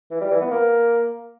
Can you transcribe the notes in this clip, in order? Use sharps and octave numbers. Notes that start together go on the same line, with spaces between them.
E3
G3
E3
B3
A#3